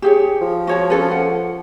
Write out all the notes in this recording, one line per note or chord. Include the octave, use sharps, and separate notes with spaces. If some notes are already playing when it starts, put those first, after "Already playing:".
G4 G#4 C#5
F3
F#4 C#5 A5
C#4 A4 B4
F#5